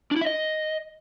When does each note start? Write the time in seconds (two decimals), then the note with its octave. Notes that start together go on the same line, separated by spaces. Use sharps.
0.11 D4
0.16 E4
0.21 E5
0.26 D#5